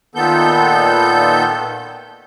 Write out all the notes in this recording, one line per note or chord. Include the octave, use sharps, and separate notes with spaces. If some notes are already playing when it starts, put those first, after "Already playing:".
A#2 D#3 B3 A4 G6